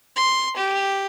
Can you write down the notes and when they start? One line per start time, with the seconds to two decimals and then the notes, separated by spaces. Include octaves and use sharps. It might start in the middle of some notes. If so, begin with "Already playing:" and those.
0.16 C6
0.57 G4